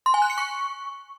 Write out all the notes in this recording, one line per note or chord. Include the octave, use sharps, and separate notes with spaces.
C6
G#5
F#6
C#7
C#6